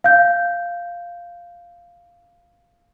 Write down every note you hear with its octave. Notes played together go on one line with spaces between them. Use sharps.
F5 G6